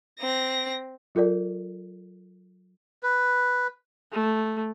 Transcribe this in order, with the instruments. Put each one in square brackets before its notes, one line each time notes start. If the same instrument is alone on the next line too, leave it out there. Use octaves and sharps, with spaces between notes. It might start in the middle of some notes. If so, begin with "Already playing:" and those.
[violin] C4 A#6
[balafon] F#3 F4 A4 A#4 D5
[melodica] B4
[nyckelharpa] A3